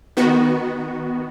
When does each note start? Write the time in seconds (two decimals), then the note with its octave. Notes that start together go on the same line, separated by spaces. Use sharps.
0.17 D#3 B3 F#4